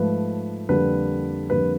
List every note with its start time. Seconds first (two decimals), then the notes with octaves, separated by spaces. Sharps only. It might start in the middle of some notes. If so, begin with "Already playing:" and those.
Already playing: G#2 F3 A3 B4
0.69 F2 D3 G3 A#3 B4
1.50 F2 D3 G3 A#3 B4